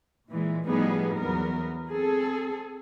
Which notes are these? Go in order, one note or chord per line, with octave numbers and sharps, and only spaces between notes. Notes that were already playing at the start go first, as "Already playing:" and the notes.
A#2 E3 G#3
A2 F3 G3 B3 D#4 G#4
E2 F#3 B3 A#4
C4 G#4 A4